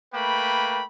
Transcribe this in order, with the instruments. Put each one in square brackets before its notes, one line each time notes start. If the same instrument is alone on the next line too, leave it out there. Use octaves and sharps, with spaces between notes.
[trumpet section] A3 A#3 B4 G5 B5